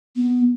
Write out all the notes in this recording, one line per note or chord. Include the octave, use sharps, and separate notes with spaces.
B3